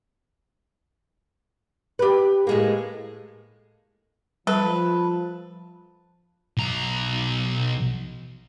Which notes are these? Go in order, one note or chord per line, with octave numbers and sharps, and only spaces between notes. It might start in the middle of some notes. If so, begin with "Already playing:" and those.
G4 B4
A2 G#3 A#3
F3 G3 A4 B4
B1 A#5